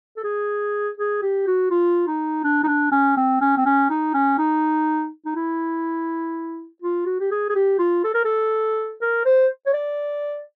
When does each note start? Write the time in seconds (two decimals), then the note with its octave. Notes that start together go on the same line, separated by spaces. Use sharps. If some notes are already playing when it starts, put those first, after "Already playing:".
0.17 A4
0.24 G#4
0.97 G#4
1.22 G4
1.47 F#4
1.71 F4
2.08 D#4
2.44 D4
2.64 D#4
2.67 D4
2.92 C#4
3.17 C4
3.41 C#4
3.58 C4
3.66 C#4
3.90 D#4
4.14 C#4
4.38 D#4
5.26 D#4
5.35 E4
6.82 F4
7.06 F#4
7.20 G4
7.31 G#4
7.49 G#4
7.55 G4
7.79 F4
8.04 A4
8.14 A#4
8.25 A4
9.02 A#4
9.26 C5
9.66 C#5
9.74 D5